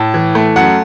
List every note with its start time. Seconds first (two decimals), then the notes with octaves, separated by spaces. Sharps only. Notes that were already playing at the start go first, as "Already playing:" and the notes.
Already playing: A2 A5
0.14 E3
0.35 A3
0.56 F#2 F#5